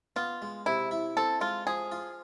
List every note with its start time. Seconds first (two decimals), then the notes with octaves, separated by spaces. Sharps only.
0.16 B3 F4
0.42 G#3
0.66 C3 E4
0.91 E4
1.17 C4 A4
1.41 G#3 F4
1.67 F3 G#4
1.92 F4